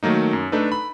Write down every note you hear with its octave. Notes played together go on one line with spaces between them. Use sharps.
D#3 F#3 A3 A#3 D#4
F#2
A3 D4 D#4 A4 B4
B5